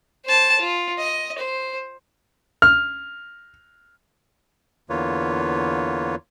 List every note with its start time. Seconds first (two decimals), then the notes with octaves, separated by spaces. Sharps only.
0.25 C5 A5
0.59 F4
0.98 D#5
1.38 C5
2.62 F6
4.90 E2 D3 A#3 F4 B4 C#5